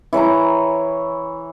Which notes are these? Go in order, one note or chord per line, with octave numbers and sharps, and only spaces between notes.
E3 C#5 G#5 A#5